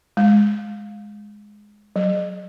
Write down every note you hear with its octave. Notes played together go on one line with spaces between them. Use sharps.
G#3
F#3